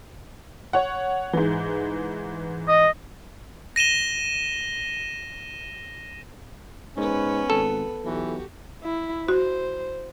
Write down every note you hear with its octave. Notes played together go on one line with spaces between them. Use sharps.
C#5 F#5
G#2 E3
D#5
A#6 D#7 E7 G7
G#2 B3 C#4 B4
G#1 A4
B1 E3 F#4 G4
E4
F#4 C5